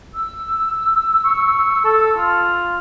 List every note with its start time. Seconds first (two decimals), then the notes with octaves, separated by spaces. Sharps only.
0.13 E6
1.25 C#6
1.85 A4
2.17 F4